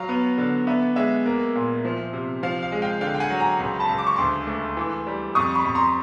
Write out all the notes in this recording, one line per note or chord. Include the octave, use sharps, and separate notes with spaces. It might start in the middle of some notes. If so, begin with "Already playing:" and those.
Already playing: F#3 F5
B3
D3
B3 E5
G#3 E5
A#3
A#2
F3
C3
F3 F5
F5
G#3
F5 G5
D3 F5 G5
G5
F#5 G#5
F#3
G#5 A#5
C#2
A5 B5
C#2
D6
C#6
D2 C6 D6
A3
E3
G3
F2 C#6 D#6
B5 C#6
F2
A#5 C6